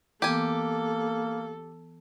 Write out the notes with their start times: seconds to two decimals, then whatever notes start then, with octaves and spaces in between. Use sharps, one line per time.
0.22 E3 A#3 B3 G4 A4 G#5